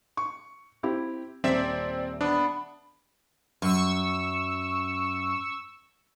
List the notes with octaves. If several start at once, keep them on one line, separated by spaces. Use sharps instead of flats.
C#6
C4 E4 G4
D#1 C4 D5 E5 B6
B3 D4
F#2 C#6 E6